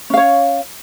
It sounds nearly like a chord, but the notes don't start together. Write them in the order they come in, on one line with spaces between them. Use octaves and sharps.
C#4 F5 C#5